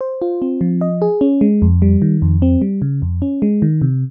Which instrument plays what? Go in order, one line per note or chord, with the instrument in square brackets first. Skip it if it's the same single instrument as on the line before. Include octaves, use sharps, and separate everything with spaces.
[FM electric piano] C5
F4
C4
F3
D#5
G#4
C#4
G#3
F2
G3
D#3
F2
C4
G3
C#3
F2
C#4
G#3
D#3
C3